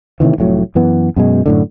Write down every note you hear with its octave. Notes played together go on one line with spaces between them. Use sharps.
A2 C3 D#3 E3
F1 A2 F#3
F#2 E3 B3
F#2 B2 G#3
F#2 A2 D3